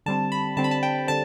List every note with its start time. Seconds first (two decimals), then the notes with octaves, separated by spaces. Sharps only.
0.06 D3 G3 C4 A5
0.32 B5
0.57 D3 G3 C4 A5
0.64 B5
0.71 A5
0.83 G5
1.08 D3 G3 C4 A5